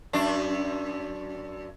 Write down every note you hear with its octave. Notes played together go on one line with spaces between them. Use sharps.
F#2 D4